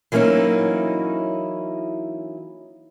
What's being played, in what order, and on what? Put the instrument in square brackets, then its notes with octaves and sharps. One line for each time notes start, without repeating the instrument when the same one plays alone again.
[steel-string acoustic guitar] E3 F#3 A#3 C#4 D#4 E4